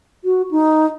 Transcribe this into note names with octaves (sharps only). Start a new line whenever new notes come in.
F#4
D#4